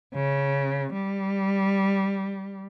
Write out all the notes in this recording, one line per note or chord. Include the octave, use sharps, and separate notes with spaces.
C#3
G3